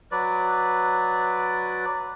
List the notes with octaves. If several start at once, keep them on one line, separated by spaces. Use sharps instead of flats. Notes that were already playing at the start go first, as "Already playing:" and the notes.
F#3 B4 D5